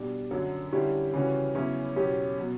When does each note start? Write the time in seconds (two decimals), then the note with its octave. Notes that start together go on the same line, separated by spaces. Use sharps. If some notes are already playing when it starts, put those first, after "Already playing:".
Already playing: B2 G3 D4
0.31 F#2 D3 F#3
0.72 D3 G3 C#4 E4 G4
1.13 C#3 E3 G3 C#4 F#4
1.55 E2 C#3 F#3 C#4 E4
1.96 E2 B2 F#3 C#4 G4
2.38 B2 F#3